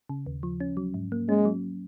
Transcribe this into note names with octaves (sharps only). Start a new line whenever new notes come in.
C#3
D#2
F3
C#4
F#3
G#2
A#3
G#3 C#4
F#3